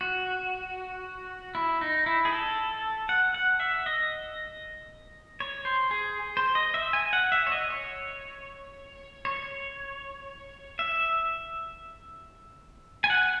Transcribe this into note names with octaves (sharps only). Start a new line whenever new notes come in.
F#4
E4
D#4
E4
G#4
A4
F#5
F#5
E5
D#5
C#5
C5
G#4
C5
D#5
E5
G#5
F#5
E5
C#5
D#5
C#5
C#5
E5
G#5
F#5